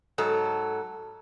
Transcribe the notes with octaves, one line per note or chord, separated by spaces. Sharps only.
G#2 F#3 A4